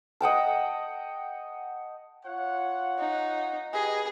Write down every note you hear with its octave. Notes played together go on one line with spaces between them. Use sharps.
D#5 F#5 G5 A5
F4 C#5 F#5
D#4
G4 G#4 B4 D#5